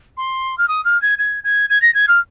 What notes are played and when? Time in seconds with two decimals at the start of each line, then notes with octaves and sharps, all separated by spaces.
0.17 C6
0.58 F6
0.68 D#6
0.85 F6
1.02 G#6
1.19 G#6
1.44 G#6
1.70 G#6
1.82 A#6
1.94 G#6
2.08 F6